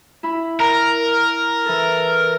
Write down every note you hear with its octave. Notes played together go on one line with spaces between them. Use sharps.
E4 B5
A#4 A#5
E3 A4